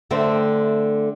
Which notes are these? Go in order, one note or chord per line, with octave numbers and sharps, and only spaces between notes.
D3 A3 C4